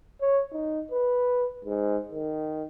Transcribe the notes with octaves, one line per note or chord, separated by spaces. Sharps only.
C#5
D#4
B4
G#2
D#3